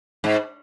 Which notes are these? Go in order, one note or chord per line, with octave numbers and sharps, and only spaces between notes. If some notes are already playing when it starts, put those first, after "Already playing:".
G#2